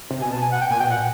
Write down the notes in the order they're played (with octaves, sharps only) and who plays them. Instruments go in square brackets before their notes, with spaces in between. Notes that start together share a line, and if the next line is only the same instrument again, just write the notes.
[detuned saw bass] C3
[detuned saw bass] B2 [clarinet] G#5
[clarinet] A5
G#5
F#5
G5
[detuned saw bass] A#2 [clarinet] G#5
[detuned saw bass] B2 [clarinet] G5
[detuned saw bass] A#2 [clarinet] F#5